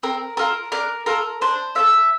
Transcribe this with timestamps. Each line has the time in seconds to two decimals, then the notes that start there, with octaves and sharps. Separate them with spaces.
0.03 C4 A#4
0.37 F4 A4 A#4
0.72 D4 A#4
1.06 F4 A4 A#4
1.41 D4 C5
1.75 F4 A4 E5